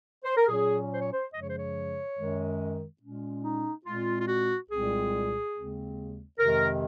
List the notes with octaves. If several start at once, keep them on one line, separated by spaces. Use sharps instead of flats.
C5
A#4
A#2 F#3 C#4 G#4
C5
C#5
C5
F#2 C#3 F3 G#3 D#5
C#5
C5
C#5
F#2 D#3 G#3
A#2 G#3 C#4
D#4
A#2 G#3 C4 F4
F4
F#4
C2 A#2 G#3 C4 G#4
D#2 C#3 G#3 C4
F2 C3 D#3 G#3 A#4